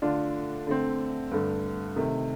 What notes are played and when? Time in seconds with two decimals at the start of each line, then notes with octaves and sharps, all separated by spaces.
0.02 D3 A3 D4 F4
0.67 D3 A3 C4
1.31 G2 D3 A3
1.96 C3 D#3 A3